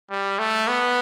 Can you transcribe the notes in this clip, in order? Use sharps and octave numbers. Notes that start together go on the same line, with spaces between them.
G3
A3
B3